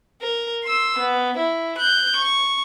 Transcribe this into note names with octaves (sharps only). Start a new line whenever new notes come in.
A#4
C6 E6
B3
E4
F#6 G6
C#6